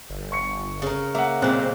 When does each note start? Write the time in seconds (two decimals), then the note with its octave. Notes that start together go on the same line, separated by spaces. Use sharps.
0.10 G1
0.32 C#6 C#7
0.82 C#3 A#4
1.15 A#3 E5 F#5
1.42 B1 A#2 G#3 C4 F#6